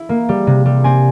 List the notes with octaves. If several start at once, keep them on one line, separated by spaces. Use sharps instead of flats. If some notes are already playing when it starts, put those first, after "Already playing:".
Already playing: E4
A#3
G3
C3
G3
C4 G#5